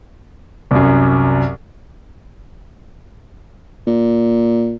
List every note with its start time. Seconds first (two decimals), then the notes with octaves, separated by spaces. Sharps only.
0.71 C2 F#2
3.87 A#2